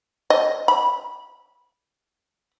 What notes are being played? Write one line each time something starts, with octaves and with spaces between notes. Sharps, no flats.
D#5
B5